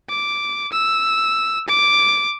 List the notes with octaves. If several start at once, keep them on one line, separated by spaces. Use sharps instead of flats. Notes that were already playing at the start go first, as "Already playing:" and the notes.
D6
E6
D6